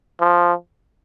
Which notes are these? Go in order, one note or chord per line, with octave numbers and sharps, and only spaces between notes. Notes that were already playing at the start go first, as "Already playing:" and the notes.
F3